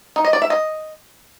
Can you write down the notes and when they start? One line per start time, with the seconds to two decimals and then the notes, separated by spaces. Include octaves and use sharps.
0.16 D#4
0.25 D#5
0.33 D5
0.42 E5
0.50 D#5